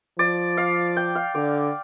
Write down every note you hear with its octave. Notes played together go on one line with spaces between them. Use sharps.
F3 D5
F5
G5
F5
D3 D5